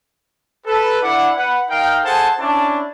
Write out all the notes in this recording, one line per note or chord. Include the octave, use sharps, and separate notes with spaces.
A4 B4
D4 E4 F#5
B4 F#5
D#4 A#4 F5 G5
G#4 A4 C5 F#5 G#5 A5
C#4 D4 E4 A5